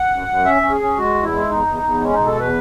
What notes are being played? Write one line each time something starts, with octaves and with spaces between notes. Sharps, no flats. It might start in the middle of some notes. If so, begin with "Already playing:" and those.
Already playing: F#5
F#2
F#2
C#4 E5
C#4
G#4
C#4
G#3 F#4
E2
E4
G#3
E2 D#4
E2
E2
G#3 C#4
B2 D#4
A4
E2 B4